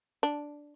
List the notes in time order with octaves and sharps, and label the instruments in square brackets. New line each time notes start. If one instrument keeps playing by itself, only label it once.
[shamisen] D4